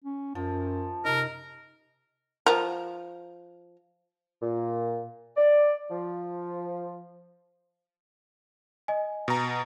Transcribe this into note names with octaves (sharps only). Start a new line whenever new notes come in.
C#4
F#2 F3
C3 D#4 A#4
F3 A#4
A#2
D5
F3
D#5 G#5
B2 A#5